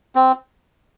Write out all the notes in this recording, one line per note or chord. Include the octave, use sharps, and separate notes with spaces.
C4